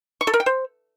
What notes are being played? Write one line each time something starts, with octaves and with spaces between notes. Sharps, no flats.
C#6
A4
A#4
G5
C5